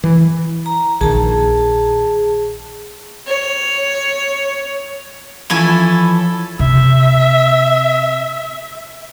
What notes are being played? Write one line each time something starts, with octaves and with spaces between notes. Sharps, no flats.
E3
A#5
A#1 D#3 G#4 A5
C#5
E3 F3 C#4 E4 A4 G#5
C3 E5